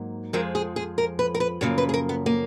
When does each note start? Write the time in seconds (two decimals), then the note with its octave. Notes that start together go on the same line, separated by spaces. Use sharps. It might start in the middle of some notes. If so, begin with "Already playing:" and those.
Already playing: G#2 F#3 A#3
0.33 F2 F3 G#3 A#4
0.55 G#4
0.76 G#4
0.98 A#4
1.19 B4
1.35 A#4
1.40 B4
1.61 F#2 C#3 F3 A#3 C#5
1.78 B4
1.89 G#4
1.94 A#4
2.09 B3
2.26 A#3